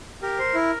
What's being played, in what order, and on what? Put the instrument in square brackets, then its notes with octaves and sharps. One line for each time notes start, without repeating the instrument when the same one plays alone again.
[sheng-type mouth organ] G4 [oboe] A#4
[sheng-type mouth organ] C5
E4